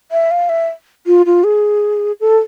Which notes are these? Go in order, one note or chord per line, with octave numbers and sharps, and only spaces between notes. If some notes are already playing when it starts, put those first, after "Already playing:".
E5
F5
E5
F4
F4
G#4
A4